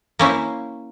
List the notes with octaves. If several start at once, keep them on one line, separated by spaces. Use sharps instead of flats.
A#3 C#4 E4 C5